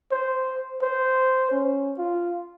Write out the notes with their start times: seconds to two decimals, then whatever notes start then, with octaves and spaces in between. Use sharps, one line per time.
0.11 C5
0.82 C5
1.51 C#4
1.98 F4